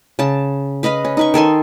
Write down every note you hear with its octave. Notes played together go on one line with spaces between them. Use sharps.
C#3 A5
B4 D#5 F5 B5
C#4
D#4 B4 C#6
D#3 A4 G#5 C6